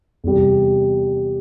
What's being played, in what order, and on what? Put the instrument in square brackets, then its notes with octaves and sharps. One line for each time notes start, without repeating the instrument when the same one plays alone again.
[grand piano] E2 C3 G3